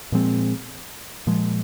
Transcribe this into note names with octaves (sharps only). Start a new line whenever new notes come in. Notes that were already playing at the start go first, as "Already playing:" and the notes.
A#2 F3 G#3 C4
A#2 F3 G#3